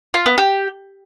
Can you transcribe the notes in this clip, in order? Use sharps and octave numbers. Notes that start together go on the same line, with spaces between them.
F4
B3
G4